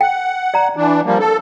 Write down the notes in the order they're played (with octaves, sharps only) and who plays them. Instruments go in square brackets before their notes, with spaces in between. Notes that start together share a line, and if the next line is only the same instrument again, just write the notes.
[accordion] F#5 [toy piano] G5
[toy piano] D5 A#5
[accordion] E3 D4
F3 G3 A#3
A4